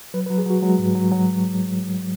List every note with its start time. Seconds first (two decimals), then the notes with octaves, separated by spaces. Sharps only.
0.14 F#3 B4
0.26 B4
0.30 F#3
0.38 G#4
0.46 F#3 F#4
0.62 F#3 G#3
0.79 G#2
0.95 F#3
1.12 F#3